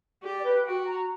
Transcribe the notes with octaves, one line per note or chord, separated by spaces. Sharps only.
G4 D5
B4
F#4 G5
A#5